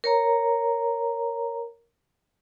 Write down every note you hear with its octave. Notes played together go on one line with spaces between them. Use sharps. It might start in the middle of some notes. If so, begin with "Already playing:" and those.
A#4 C#5 A#5